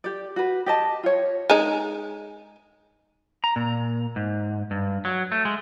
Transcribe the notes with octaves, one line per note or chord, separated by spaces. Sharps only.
G4 D5
F#4 B4
G4 D#5 A5
F4 C#5
G#3 D#4
A#5
A#2
G#2
G2
F#3
A3
G#3